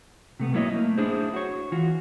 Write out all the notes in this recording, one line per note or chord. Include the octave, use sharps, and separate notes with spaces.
C3 A3 B3
F#3 A#3 B3 E4 C#5 D#5
A3 A#3
D4 E4 G#4 C5
F#4 C#5
E3 F4 F#4